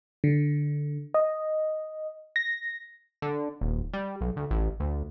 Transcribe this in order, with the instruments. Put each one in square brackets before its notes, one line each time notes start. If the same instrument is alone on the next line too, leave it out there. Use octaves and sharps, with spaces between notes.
[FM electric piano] D3
D#5
A#6
[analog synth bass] D3
D#1
G3
B1
D2
A1
D2